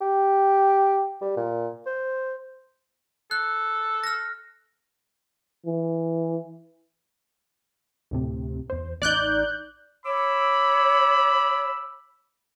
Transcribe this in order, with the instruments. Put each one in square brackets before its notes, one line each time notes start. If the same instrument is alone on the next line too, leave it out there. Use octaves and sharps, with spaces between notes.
[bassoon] G4
G3
A#2
C5
[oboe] A4 [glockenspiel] F#6
[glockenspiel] F6 A#6
[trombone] E3
[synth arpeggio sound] D2 A2 C3
E2 C5
[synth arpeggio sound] A1 D#4 [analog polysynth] D5 F#6 G6
[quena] C#5 [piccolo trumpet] B5 [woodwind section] D6 E6